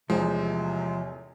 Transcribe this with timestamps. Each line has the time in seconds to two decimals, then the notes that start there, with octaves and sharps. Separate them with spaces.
0.10 A1 E2 C3 F3 G#3